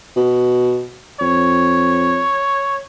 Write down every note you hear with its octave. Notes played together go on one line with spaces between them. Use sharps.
B2
F2 C#5